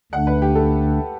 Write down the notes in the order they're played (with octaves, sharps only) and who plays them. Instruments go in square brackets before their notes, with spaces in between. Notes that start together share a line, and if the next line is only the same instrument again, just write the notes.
[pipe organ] D2 D3 A3 D4 [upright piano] F#5
[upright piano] B4
G4
A4